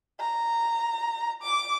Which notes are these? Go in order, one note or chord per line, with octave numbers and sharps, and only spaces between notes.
A#5
D6